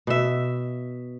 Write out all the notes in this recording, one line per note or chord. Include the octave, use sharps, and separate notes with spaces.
B2 E5